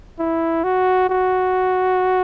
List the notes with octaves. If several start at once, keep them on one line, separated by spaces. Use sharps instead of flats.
E4
F#4
F#4